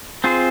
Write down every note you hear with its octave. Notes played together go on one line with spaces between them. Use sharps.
C4 F4 G#4 C5